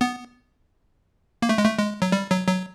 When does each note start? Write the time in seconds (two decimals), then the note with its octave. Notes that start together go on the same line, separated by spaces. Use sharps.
0.01 B3
1.42 A#3
1.49 A3
1.58 G#3
1.65 A3
1.78 G#3
2.02 F#3
2.12 G3
2.31 F#3
2.48 F#3